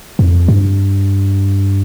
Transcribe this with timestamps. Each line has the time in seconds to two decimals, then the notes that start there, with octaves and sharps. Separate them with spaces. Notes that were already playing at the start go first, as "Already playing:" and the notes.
0.19 F2
0.48 G2